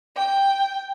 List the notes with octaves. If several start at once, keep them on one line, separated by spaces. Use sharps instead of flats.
G5